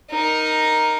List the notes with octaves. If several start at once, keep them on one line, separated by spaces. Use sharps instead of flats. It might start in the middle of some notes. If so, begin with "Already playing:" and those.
D#4 A#4